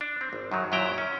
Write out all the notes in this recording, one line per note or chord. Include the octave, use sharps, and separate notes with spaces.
D4
C4
G#1
F#2 D#3 F#3
F#2 A#2 F#3 E4 G5 A#5
C#4